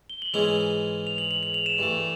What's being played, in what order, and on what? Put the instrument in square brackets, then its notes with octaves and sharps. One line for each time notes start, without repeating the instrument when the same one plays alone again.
[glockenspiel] G7
F#7
[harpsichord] G#2 E3 G#3 C#4 E4 [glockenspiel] F7
[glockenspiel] F7
F#7
F#7
F#7
F7
E7
[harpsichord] G2 E3 A3